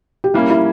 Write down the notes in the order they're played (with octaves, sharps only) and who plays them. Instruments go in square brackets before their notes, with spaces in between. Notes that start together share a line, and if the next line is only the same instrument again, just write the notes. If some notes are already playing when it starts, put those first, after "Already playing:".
[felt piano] G4
[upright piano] G3 A#3 C#4 [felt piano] E4
[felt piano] E4